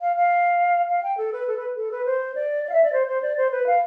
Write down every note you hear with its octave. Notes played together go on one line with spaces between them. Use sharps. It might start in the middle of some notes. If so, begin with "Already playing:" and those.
F5
F5
F5
G5
A4
B4
A4
B4
A4
B4
C5
D5
D5
F5
E5
D5
C5
C5
D5
C5
B4
F5